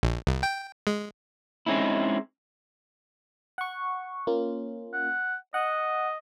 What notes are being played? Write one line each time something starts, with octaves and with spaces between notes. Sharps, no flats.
A#1
C2
G5
G#3
G#3 C4 C#4 D#4 E4
F#5 C#6
A#3 C#4 F4
F#5
D#5 F#5